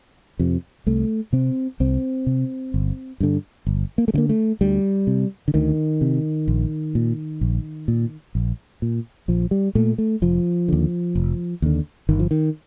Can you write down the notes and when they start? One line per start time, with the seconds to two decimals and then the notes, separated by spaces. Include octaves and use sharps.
0.39 F2 C3
0.87 C2 A3
1.33 C3 C4
1.80 C2 C4
2.27 C3
2.74 G1
3.20 G2 D3
3.67 G1
3.98 A#3
4.08 A3
4.14 G2 D3 A#3
4.29 A3
4.61 D2 G3
5.07 C3
5.48 D3
5.54 D2 D#3
6.01 C3
6.48 A#1
6.95 A#2
7.41 A#1
7.88 A#2
8.35 A#1
8.82 A#2
9.28 A#1 F3
9.51 G3
9.75 A#2 A3
9.98 A3
10.22 F1 F3
10.68 D#2 D3
11.16 F1
11.62 D#2 D3
12.09 G1 D#3
12.19 F3
12.31 D#3